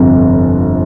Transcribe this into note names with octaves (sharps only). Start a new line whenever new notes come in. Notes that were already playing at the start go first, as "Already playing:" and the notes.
Already playing: G1 F2 C3